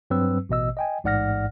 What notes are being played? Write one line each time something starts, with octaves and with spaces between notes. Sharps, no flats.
G2 F#3 C4 B4 E6
A1 B2 D#5 E6
D#5 G5 G#5
A1 G#2 D5 F#5 F6 A#6